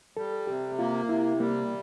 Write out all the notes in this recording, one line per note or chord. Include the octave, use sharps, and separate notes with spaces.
G3 A4
C3 G4
A#3 F4
C3 E4
G3 A#3